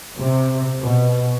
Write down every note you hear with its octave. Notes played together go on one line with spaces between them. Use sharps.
C3
B2